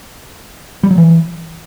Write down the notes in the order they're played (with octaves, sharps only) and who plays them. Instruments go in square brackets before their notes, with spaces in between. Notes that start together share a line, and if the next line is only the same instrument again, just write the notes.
[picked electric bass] G3
F#3
E3